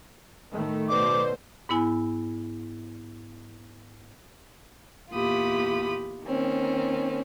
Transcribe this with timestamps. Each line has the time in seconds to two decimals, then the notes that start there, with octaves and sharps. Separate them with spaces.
0.50 A2 D#3 A3
0.89 B2 B4 C5 D5 D6
1.69 G#2 B3 E4 G#5
5.12 E2 A#2 F4 G4 B5 D#6
6.25 D#3 A#3 C4 C#4